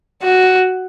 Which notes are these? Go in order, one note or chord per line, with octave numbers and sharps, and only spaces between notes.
F#4